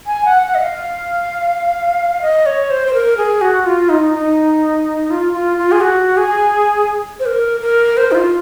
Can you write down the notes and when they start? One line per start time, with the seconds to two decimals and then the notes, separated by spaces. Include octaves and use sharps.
0.07 G#5
0.25 F#5
0.42 F#5
0.55 D#5
0.61 F5
2.22 D#5
2.46 C#5
2.70 C5
2.87 C5
2.94 A#4
3.17 G#4
3.41 F#4
3.66 F4
3.89 D#4
4.14 D#4
5.10 F4
5.33 F4
5.58 F4
5.72 G#4
5.81 F#4
6.17 G#4
7.20 C5
7.26 A#4
7.61 A#4
7.97 C5
8.11 D#4
8.15 F4